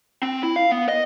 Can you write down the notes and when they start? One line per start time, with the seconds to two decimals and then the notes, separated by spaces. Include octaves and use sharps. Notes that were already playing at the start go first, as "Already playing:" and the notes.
0.23 C4
0.43 E4
0.56 F5
0.72 B3
0.89 D#5